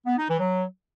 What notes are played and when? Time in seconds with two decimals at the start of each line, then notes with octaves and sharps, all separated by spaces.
0.06 B3
0.18 D#4
0.29 E3
0.40 F#3